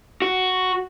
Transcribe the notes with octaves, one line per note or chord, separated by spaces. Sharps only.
F#4